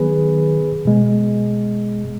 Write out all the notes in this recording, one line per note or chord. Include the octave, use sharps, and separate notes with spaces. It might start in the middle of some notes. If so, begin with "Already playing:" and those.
Already playing: D#3 F#3 B3 G#4 B4
B2 G#3 B3